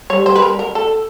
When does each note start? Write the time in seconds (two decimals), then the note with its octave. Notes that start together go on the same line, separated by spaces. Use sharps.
0.10 G3 C#5
0.26 C5
0.36 B4
0.42 A#4
0.59 A#4
0.75 A4